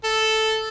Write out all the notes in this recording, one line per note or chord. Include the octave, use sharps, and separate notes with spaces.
A4